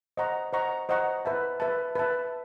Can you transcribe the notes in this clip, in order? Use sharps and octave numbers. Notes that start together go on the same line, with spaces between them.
C5 D#5 F#5 A#5 C#6
C5 D#5 F#5 A#5 C#6
C5 D#5 F#5 A#5 C#6
B4 E5 A5
B4 E5 A5
B4 E5 A5